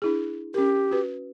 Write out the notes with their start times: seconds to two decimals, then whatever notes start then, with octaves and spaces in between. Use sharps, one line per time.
0.02 D4 E4 G#4
0.54 C#4 G4 A#4
0.91 F#4 B4